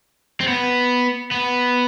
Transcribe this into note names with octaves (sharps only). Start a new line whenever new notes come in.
C4
B3
B3